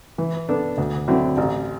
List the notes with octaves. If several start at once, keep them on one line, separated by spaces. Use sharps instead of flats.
E3
B3 D4 A4
D2
D3 F#3 C4 E4
A1